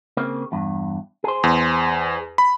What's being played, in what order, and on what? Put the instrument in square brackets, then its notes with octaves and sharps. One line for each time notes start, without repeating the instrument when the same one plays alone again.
[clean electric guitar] C#3 A#3 C4
E2 G2
G#4 C5
[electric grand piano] E2
B5